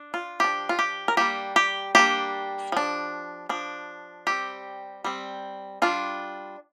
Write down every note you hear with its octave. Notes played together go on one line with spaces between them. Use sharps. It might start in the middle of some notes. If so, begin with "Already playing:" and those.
Already playing: D4
F4
F3 D4 G4
F4
G4
A#4
G3 A#3 D4 G4
G4
G3 A#3 D4 G4
F3 D4
F3 D4
G3 C4 G4
G3 C4
G3 D4 F4